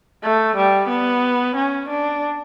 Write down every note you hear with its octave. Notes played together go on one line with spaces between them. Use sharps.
A3
G3
B3
C#4
D4